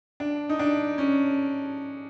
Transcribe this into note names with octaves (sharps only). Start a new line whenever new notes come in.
D4
D#4
D4
C#4